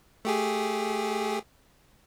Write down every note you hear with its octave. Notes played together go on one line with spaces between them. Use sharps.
A3 G4 G#4